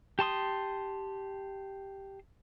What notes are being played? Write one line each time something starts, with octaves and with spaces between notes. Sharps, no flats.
G4 A5 C6 D#6